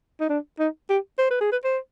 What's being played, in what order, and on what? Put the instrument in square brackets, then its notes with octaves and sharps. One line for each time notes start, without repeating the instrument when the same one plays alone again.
[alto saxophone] D#4
D4
D#4
G4
C5
B4
G#4
B4
C5